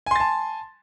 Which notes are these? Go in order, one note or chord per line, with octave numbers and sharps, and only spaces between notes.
G#5 A5 C6 A6